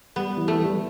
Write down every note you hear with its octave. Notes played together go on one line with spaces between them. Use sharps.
G3 B3
E3
A3
G3